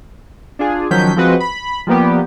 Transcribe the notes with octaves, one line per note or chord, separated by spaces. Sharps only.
D4 F4 G#4
D#3 F3 F#3 C#4 G6 B6
F3 G#3 C4 F#4 B4 D#5
B5
F3 G3 A#3 B3 G4